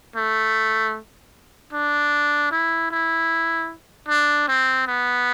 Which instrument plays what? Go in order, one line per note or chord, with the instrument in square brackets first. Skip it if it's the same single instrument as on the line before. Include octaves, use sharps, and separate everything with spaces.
[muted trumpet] A3
D4
E4
E4
D4
C4
B3